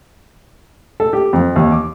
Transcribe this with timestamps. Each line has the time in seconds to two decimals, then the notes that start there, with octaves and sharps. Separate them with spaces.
1.00 A4
1.13 G4
1.33 F2
1.56 D#2
1.72 D6